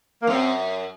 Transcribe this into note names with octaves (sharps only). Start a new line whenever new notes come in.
A#3
F#2 C4